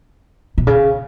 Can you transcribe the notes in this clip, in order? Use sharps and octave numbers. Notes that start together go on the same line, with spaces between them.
B2
C#3